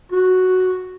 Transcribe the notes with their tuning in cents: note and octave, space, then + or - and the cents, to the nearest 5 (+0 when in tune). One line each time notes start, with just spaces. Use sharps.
F#4 +0